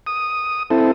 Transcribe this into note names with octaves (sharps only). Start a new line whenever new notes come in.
D#6
C4 E4 A4